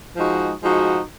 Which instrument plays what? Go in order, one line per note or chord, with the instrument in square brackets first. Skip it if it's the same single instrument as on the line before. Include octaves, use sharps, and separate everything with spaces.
[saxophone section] F3 G#3 D#4 F#4
F3 G#3 D#4 F#4